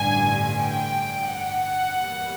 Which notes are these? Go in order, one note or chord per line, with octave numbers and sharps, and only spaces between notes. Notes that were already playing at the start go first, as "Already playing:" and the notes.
Already playing: A1 G2 D3 G#5
G5
F#5
E2 B2 G3 A#3